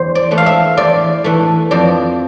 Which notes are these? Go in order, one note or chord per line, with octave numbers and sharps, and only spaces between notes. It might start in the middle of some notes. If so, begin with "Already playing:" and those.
Already playing: E2 C5
D5
E3 A3
F5
E5
E2 D5
E3 A3
F2 D5